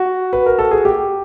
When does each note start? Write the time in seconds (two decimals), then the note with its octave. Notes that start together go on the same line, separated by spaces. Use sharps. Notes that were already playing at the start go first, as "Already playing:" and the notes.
Already playing: F#4
0.33 B4
0.46 A#4
0.59 A4
0.71 G#4
0.85 G4